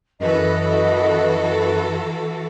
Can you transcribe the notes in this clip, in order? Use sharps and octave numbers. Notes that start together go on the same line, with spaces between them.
F#2 E3 F#4 A4 B4 D#5